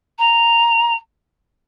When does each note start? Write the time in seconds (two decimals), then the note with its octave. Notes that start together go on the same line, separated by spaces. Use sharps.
0.19 A#5